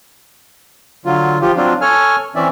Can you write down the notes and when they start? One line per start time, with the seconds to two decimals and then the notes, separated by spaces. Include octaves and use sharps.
1.05 D3 F#3 F4
1.41 F3 F4 G4
1.56 F#3 C4 D4 F4
1.81 A4 C#5 G#5 F6
2.36 E3 C4 C#4 D5 E5